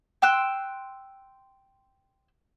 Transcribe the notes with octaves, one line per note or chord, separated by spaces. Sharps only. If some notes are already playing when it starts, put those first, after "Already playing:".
G5 C6 E6 F#6